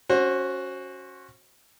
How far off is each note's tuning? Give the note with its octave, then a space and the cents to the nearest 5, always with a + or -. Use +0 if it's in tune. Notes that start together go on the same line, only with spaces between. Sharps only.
C#4 +0 F#4 +0 C5 +30